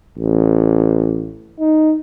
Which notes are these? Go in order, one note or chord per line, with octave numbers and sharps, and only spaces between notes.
A1
D#4